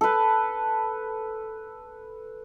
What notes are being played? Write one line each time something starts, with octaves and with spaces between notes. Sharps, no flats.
A4 B4